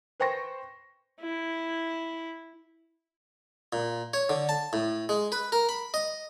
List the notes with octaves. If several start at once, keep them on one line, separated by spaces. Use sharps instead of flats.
B4 C5 G5 C#6 A#6
E4
A#2
C#5
D3
A5
A2
G#3
B4
A#4
B5
D#5